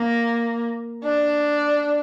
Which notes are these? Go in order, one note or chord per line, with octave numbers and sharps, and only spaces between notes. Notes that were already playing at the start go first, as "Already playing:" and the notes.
Already playing: A#3
D4